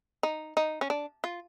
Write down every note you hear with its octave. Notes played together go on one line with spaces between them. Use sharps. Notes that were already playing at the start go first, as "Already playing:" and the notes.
D#4
D#4
C#4
D4
F4